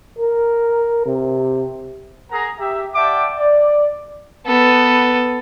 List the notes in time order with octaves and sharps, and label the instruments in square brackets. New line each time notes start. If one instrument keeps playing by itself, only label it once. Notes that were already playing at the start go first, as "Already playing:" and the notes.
[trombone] A#4
C3
[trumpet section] G#4 A#4 F#5 A#5
G4 E5
D5 E5 F#5 G5 A5 D6
D5
[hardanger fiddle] B3 A4